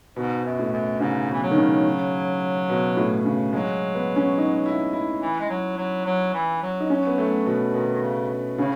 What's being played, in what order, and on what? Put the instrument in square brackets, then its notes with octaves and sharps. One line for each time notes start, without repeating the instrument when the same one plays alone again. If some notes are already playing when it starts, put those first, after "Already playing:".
[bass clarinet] G#2 [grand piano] B2
[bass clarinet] F#2
[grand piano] A2
[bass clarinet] F#2
[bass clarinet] G#2 [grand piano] C#3
[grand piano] B2 [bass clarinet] E3
[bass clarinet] F#3
[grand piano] D#3
C#3
B2
A2
C#3
[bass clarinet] F#3 [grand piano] G#3
[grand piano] B3
C#4
D#4
E4
E4
[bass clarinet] E3
G#3
F#3
F#3
F#3
E3
F#3
[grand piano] D#4
C#4
B3
A3
B2
[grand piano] B2 [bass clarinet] D#3
[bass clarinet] D#3
C#3
[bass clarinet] A2 [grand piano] C#3